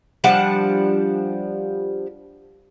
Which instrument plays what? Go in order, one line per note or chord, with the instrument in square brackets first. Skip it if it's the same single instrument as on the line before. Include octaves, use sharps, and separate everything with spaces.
[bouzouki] F3 G3 D4 F#5